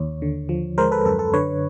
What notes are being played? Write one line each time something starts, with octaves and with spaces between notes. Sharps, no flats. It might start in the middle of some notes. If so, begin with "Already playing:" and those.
Already playing: D#2 C#5
D3
F3
G#3 A#4 C5
A4 B4
F#2 A4
A4
D3 B4 C#5